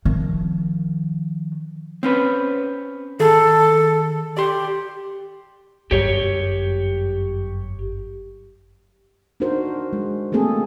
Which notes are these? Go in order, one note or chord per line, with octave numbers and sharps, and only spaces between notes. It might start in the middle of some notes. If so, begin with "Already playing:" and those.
D#3 F3
C4 C#4 B4
D#3 G#4 A4
G4 D5 C6
G1 F#2 G4 C#5
D4 D#4 F#4 A#4 C5
G#3
A3 A#3 C4 G#4 A4